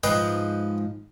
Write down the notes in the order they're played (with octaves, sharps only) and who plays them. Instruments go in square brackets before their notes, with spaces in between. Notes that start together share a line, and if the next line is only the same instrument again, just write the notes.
[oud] G#2 F3 [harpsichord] B4 D#5 G5